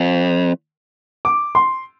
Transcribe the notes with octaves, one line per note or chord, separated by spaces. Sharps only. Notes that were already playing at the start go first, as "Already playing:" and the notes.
Already playing: F2
D6
C6